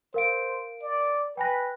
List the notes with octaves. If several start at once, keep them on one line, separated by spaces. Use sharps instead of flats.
A#4 C5 F5 D7
D5
B4 G5 G#5 A#6